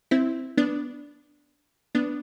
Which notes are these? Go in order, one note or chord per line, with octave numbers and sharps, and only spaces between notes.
C4 E4
B3 D4
B3 D4